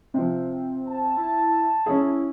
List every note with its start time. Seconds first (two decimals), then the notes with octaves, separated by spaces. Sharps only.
0.14 C3 F3 C4
0.88 A5
1.17 E4
1.86 C#4 E4 G#4